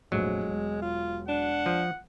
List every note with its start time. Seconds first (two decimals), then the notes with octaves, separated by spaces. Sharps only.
0.12 F1 A#1 F#3 G#3
0.48 E1
0.82 F4
1.29 D4 F#5
1.66 F3